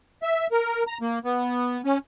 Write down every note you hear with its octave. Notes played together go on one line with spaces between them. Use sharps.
E5
A#4
A#5
A#3
B3
C#4